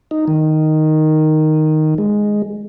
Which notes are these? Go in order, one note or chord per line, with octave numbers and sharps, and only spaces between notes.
D#4
D#3
G#3